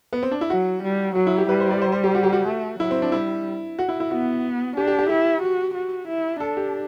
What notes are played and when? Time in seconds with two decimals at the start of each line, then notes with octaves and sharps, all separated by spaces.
0.13 B3
0.23 C4
0.31 D4
0.41 E4
0.50 F#3 F#4
0.83 G3
1.15 F#3 F#4
1.27 E4
1.38 G4
1.48 G3 B4
1.60 C5
1.71 D5
1.82 C5
1.92 C5
2.04 G4
2.15 F#4
2.23 G4
2.33 F#4
2.47 A3
2.80 F#3 E4
2.91 C4
3.02 D4
3.12 G3 E4
3.79 F#4
3.89 E4
4.00 E4
4.11 B3 F#4
4.77 D4 G4
4.88 G4
4.99 G4
5.09 E4 G4
5.43 F#4
5.75 F#4
6.08 E4
6.40 D4 A4
6.57 G4